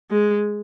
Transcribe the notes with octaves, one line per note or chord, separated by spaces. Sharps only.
G#3